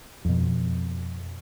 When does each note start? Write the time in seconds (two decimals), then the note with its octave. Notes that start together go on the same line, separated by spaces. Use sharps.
0.25 F2 B2